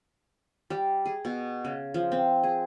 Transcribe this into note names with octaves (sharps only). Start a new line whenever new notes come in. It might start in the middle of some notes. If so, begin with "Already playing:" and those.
G3
G#4
B2
C#3
F3
C4
G#4